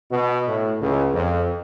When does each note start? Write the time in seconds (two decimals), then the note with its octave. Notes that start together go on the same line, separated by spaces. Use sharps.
0.11 B2
0.48 A2
0.81 C#2
1.14 F2